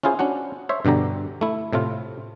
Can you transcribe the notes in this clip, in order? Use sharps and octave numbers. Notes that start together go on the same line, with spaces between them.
C#4 E4 F4 G#4 C5
C#4 D4 F#4 F#5
C5 C#5 E5
G2 B2 D3 G4 A#5
A3 E4
A2 C3 A3 F4